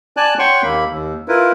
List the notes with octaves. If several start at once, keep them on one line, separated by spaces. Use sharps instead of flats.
D5 G#5 A5 F#6
C#5 F#5 G5 C6 C#6
D#2 A#3 B5
D#2
E4 F4 A#4 B4